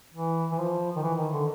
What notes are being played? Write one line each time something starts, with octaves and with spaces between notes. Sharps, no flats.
E3
E3
F3
D#3
E3
D#3
D3